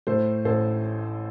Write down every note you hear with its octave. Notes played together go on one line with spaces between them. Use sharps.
A2 A4 C5
A1 A4 C5